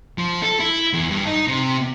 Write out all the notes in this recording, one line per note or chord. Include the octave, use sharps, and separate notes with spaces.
F3
A4
E4
E2
G2
D#4
C3